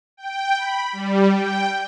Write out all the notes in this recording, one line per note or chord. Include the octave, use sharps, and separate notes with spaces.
G5
B5
G3
G5